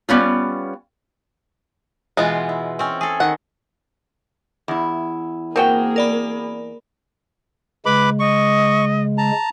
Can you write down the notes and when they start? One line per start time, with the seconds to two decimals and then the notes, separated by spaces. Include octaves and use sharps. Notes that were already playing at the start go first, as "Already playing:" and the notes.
0.09 G3 B3 C#4 F4
2.17 B2 E3 G#3 B3 F4
2.49 E4
2.79 C4 C#4
3.01 G#4 A4
3.20 D#3 F#5
4.68 E2 E4
5.56 A#3 C4 F#4 G#4 A#4 G5
5.96 A#4 D5 B5
7.86 C#3 G#3 B4 B5 D6
8.20 D#5 C#6
9.18 A5 A#5